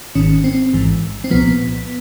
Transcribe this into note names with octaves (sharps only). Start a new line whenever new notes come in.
G#1 G#2 D#3 C#4
C4
A1 G#2 E3
C4
C2 A#2 F3 B3